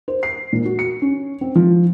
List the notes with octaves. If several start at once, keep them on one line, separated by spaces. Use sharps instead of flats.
C5
C7
A#2
F#4
C#7
C#4
C4
F3